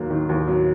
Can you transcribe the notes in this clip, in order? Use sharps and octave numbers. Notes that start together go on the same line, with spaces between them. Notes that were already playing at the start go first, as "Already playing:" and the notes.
Already playing: D#2 F#3 A#3
D#3
D#2
F#3